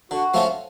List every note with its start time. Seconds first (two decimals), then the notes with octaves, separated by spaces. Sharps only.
0.11 D3 F#4
0.34 F3 A3 C#4 F4